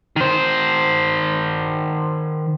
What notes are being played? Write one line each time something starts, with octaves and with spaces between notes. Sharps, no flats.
D#3 C5